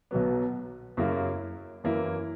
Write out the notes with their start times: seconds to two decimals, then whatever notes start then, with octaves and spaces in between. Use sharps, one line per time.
0.11 B1 B2 F#3 B3
0.97 F#2 C#3 F#3 A#3 E4
1.84 F#2 E3 A#3 E4